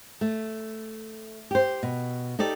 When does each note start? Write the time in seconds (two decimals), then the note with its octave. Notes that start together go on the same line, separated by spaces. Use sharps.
0.21 A3
1.51 G4 C5
1.83 B2
2.39 D#4 G4 A4 D5